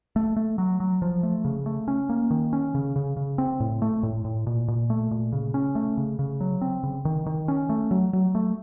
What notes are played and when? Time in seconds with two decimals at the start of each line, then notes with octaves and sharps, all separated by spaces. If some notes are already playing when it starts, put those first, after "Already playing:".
0.16 A3
0.36 A3
0.58 F#3
0.80 F#3
1.02 F3
1.23 A3
1.45 C#3
1.66 A3
1.88 C#4
2.09 A#3
2.31 D#3
2.53 C#4
2.75 C#3
2.96 C#3
3.17 C#3
3.38 C4
3.60 A2
3.82 A3
4.03 A2
4.25 A2
4.47 A#2
4.68 A#2
4.90 A3
5.11 A#2
5.33 C#3
5.54 C#4
5.75 A3
5.97 C#3
6.19 C#3
6.40 F#3
6.61 C4
6.83 C#3
7.05 D#3
7.26 D#3
7.48 C#4
7.69 A3
7.91 F#3
8.13 F#3
8.35 A3